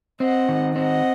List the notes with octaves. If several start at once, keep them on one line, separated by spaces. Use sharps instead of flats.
C4 D#5 F#5
D#3
C4 D#5 F#5